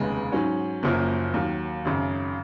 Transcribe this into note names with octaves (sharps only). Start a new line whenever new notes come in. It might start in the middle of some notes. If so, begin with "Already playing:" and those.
Already playing: F1 D#2 C#3 G#3 B3
G#2 F#3 C#4
F#1 F#2 F3 A#3
D#2 D#3 F#3
G#1 F#2 C#3